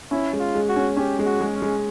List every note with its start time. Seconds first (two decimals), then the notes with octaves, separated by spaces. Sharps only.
0.11 C#4 E4
0.33 G#3
0.40 F4
0.55 G#3
0.69 F#4
0.76 C#4
0.97 C#4 G4
1.19 G#3
1.25 F#4
1.41 G#3
1.55 C#4
1.62 G#3